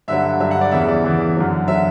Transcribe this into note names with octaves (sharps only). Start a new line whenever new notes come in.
G2 D3 F#3 E5
G2 D3 F#3 E5
F#5
D5
E2 C#3 E3 E5
D5
E2 C#3 E3
F#2 D3 F#3
D3 F#3 E5